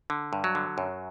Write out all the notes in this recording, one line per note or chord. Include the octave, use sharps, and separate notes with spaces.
D3
G2
F#3
D3
F#2